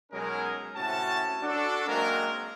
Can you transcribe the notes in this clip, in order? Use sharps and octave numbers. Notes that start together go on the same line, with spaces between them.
B2 F#3 G#3 C#4 D#4 A#4
A2 C3 C#4 F#4 A5
D4 F#4 A4
F#3 G#3 A#3 C4 C#4 A#4